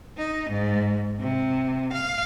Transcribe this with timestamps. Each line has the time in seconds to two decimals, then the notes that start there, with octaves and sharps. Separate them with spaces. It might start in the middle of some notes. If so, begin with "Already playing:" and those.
0.18 D#4
0.50 G#2
1.20 C3
1.93 F5